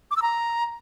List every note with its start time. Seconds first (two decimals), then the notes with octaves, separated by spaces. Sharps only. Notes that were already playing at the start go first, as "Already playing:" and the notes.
0.11 D6
0.17 E6
0.22 A#5